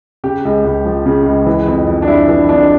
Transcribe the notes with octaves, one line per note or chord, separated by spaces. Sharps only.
C#3 G4
C#2
C#2
F3
C#3
C#2
E3
F2
F2
D4
G3 E4
E3 D4
F2 D4